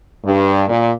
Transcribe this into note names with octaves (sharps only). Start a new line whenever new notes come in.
G2
A#2